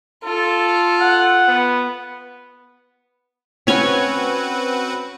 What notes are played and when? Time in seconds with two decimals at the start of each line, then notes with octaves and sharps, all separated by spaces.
0.24 F4 A4
1.00 F#5
1.48 B3
3.67 C4 C#4 F#4 B4 C#5 G#5